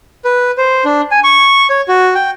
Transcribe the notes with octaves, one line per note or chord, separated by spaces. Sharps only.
B4
C5
D4
G#5
C#6
C#5
F#4
G5